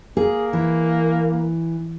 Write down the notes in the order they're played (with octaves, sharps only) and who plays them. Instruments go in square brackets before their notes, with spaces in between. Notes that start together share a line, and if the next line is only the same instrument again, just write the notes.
[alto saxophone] A#3 [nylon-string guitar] G#4
[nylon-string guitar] E3